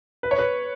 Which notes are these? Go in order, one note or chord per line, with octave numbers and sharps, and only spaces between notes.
B4
C#5
B4